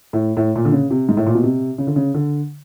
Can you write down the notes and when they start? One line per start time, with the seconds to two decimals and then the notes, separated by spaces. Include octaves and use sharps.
0.13 A2
0.37 A2
0.56 A#2
0.65 D3
0.72 C#3
0.91 C3
1.09 G#2
1.17 A2
1.27 A#2
1.35 B2
1.44 C3
1.78 C#3
1.87 D3
1.96 C#3
2.14 D3